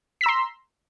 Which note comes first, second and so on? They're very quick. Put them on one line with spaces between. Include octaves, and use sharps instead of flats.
B6 E6 A#5 C6